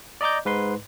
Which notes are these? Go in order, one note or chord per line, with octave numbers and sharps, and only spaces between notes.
D5 D#5 A#5 D6 G6
G#2 B4 C6